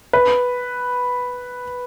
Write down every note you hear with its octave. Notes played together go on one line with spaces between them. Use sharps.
B4